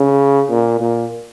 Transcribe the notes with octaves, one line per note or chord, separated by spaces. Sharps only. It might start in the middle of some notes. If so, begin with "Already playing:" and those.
Already playing: C#3
A#2
A#2